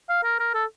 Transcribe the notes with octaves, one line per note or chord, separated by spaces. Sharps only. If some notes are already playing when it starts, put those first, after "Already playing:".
F5
A#4
A#4
A4